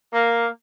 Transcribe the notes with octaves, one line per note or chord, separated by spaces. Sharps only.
A#3